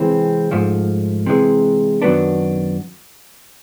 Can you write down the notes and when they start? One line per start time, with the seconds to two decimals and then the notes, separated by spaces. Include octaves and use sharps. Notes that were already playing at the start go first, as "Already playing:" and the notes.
Already playing: C3 E3 G#3 C4
0.51 G#2 F3 A3
1.26 C3 E3 G#3
2.02 F#2 D#3 F#3 B3 D4